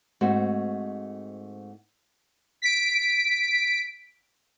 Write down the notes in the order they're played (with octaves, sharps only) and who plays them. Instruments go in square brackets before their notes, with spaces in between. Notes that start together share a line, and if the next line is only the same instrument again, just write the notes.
[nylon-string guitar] G#2 A3 C4 F#4
[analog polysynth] B6 D7